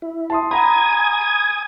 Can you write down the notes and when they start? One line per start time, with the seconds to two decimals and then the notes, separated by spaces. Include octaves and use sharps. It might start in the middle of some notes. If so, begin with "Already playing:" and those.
0.02 E4
0.30 A5 C6 D#6
0.51 F#5 G#5 A#5 B5 D#6 G#6